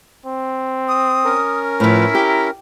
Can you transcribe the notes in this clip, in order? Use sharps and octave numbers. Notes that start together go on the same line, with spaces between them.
C4
D#6
C#4 A#4
A2 F3 E4 B4
G4 A#5